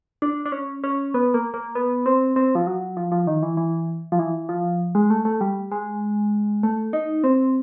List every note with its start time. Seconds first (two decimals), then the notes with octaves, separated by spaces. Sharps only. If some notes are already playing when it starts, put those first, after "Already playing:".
0.22 D4
0.46 D4
0.52 C#4
0.84 C#4
1.14 B3
1.34 A#3
1.54 A#3
1.75 B3
2.06 C4
2.36 C4
2.55 F3
2.67 F#3
2.97 F3
3.12 F3
3.27 D#3
3.43 E3
3.57 E3
4.12 F3
4.19 E3
4.49 F3
4.95 G#3
5.10 A3
5.25 A3
5.41 G3
5.72 G#3
6.63 A3
6.93 D#4
7.24 C4